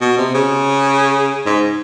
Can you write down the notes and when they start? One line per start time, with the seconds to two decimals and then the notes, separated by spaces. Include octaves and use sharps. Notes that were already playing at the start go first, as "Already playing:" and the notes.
0.01 B2
0.18 C3
0.34 C#3
1.46 G#2